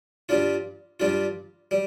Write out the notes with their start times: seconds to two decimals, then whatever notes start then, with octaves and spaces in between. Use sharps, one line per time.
0.29 G2 G3 D4 F4
1.00 G2 G3 D4 F4
1.71 G3